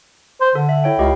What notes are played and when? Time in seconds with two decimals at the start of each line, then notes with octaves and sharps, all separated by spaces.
0.41 C5
0.55 D3 A4
0.69 E5
0.84 E4 C#5 G5
0.99 C#2 G4 D#5 F5